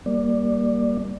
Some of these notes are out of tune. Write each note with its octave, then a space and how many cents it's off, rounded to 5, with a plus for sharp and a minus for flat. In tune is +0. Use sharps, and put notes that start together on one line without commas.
G3 +0 A#3 +15 D5 +0